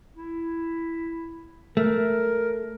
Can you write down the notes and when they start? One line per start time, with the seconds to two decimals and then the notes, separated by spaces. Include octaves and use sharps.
0.17 E4
1.77 A3 A#4